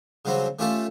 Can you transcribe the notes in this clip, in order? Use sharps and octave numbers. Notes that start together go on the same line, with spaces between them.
C#3 F#3 G3 C4 C#4
A3 C#4 F4 G4 A4